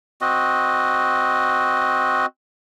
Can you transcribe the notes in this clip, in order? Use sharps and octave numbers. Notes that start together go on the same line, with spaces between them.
C4 F#4 D#5